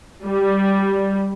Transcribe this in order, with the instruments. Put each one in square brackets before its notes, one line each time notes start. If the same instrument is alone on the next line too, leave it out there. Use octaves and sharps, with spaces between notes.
[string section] G3